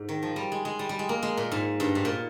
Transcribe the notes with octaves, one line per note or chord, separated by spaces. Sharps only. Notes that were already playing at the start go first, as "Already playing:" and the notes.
Already playing: G#2
D#3
F3
G3
G#3
G#3
G3
G3
G#3
A#3
G#3
A#2
G#2
G2
G#2
A#2